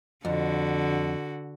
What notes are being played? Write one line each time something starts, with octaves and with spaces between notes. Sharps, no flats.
F2 D3 F#4